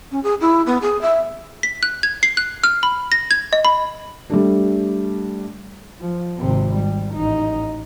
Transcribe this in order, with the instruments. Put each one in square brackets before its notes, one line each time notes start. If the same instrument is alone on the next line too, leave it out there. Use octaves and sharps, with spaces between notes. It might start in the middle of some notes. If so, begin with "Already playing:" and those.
[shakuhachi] C#4
G#4
E4
B3
G#4
E5
[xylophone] B6
F#6
G#6
C7
F#6
F6
B5
A#6
G#6
D#5
B5
[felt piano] G3 A3 D4
[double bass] F3
G#1 C3
G3
A1 D#4